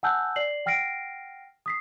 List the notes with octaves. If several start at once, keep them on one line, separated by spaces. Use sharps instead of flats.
F#5 G#5 A5 E6 F#6 G6
D5 C7 F#7
F#5 G5 F6 A#6 C7 D7
D#6 B6 C7